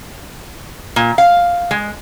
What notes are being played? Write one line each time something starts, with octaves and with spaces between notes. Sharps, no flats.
A#2
F5
G#3